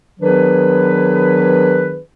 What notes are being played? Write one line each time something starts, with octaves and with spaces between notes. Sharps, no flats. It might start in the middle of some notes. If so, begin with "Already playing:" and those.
D#3 F#3 B3 D4 G#4 B4